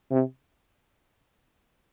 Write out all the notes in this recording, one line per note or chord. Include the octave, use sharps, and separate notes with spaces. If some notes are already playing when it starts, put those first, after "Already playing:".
C3